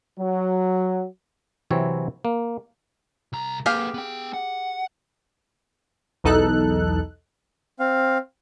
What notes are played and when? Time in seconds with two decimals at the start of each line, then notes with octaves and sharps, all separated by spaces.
0.19 F#3
1.70 C3 E3 F#3 C4 E4 C#5
2.25 A#3
3.33 C2 A#5
3.66 A#3 G4 G#4 B4 F5
3.94 B3 G5
4.34 F#5
6.24 B1 E2 D#4 A4 F#6
7.79 C4 F5